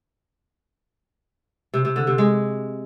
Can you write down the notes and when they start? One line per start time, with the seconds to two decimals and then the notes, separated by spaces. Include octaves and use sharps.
1.74 C3
1.85 C3
1.96 D3
2.07 C3
2.18 G#3